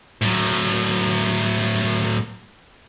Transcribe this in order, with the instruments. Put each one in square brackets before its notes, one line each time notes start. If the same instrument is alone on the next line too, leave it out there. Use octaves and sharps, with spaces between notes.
[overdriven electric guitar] A2 F#3